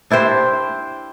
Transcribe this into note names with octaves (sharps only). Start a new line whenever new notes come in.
D4 E4 G4 C5